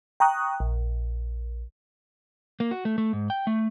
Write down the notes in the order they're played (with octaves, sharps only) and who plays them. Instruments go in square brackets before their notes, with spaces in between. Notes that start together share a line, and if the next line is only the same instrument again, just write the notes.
[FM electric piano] G5 A#5 C#6 D#6 F#6
A#1
[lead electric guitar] A#3
F#4
A3
A3
G#2
G5
A3